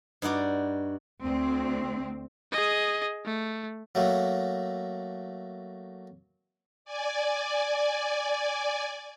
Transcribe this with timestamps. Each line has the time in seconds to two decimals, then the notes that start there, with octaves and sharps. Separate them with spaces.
0.22 G2 D#4 F#4 D5
1.23 D2 C4
2.52 G#4 D#5
3.25 A3
3.95 F#3 A3 A#3
6.85 D5 G#5